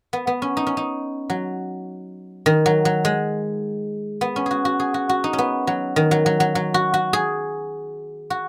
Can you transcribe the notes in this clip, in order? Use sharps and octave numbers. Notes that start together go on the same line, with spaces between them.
B3
B3
C#4
D#4
C#4
D#4
F#3
D#3
F#3
F#3
G#3
B3
C#4
F#4 G#4
F#4
G#4
F#4
F#4
D#4
C#4
B3
F#3
D#3
F#3
F#3
F#3
F#3
F#4
F#4
G#4
F#4